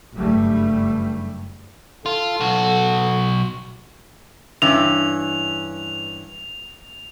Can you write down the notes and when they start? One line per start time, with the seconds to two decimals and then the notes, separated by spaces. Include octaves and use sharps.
0.14 F#1 G2 G3 A3
2.06 F4 A4
2.41 B1 F#4
4.62 G2 E3 C#4 F7